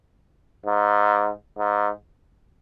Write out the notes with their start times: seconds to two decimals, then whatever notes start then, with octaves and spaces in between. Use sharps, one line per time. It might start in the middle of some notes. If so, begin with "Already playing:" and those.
0.66 G#2
1.58 G#2